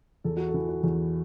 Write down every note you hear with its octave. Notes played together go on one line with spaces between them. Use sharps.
E2 A4
F#4
A4
E3
F#4
E2